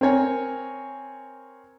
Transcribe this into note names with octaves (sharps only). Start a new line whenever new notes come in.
C4 A#4 C#5 G#5